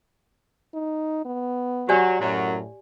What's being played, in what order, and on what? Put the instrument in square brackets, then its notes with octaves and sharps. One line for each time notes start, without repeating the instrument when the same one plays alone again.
[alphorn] D#4
B3
[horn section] F#3 [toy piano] G4 D5 G#5
[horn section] F#2 F#3 [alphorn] A2